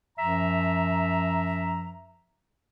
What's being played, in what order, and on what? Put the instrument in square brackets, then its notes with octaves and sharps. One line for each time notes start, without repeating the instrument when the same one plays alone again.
[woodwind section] F#2 F3 E5 A#5